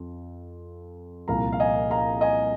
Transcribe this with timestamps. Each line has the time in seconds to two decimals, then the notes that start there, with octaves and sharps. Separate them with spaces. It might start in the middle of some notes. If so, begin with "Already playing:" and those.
Already playing: F2 F3
1.28 C2 A#2 F3 F5 A#5
1.52 F5
1.60 D#5 G#5
1.90 F5 A#5
2.21 D#5 G#5